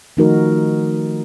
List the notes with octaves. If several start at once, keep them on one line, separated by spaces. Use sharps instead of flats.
D#3 F3 A3 D#4 F#4 A#4